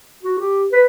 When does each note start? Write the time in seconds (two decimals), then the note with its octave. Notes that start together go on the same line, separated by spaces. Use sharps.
0.23 F#4
0.39 G4
0.72 B4